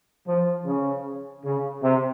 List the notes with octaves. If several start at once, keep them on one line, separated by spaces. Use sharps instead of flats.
F3
C#3
C#3
C3